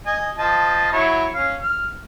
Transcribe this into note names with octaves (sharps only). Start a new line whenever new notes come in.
D#5 G#5
F3 D#5 A5
F#3 E4 C#5
C#4 F5
F6